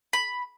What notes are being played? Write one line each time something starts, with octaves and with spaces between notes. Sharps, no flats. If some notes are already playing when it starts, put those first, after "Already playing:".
B5